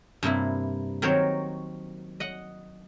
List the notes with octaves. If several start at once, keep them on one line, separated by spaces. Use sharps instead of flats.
G2 C3 A#3 E4
D#3 F#3 C4 A#4 C5 C#5
D#5 F#5